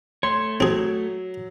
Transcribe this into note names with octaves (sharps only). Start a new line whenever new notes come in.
A3 C#5 C6
F#3 C4 G#4